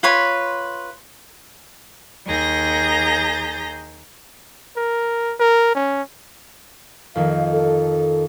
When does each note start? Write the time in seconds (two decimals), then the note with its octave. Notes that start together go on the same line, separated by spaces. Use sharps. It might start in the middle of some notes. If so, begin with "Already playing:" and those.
0.03 F4 B4 C#5 C6
2.26 D#2 G#4 A#5 G6 A#6
4.77 A#4
5.40 A#4
5.75 C#4
7.15 F2 D#3 A#3 F5
7.52 A4